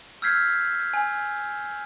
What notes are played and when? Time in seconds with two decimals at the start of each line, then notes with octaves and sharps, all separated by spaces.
0.22 E6 F6 G6 G#6 B6 C7
0.94 G#5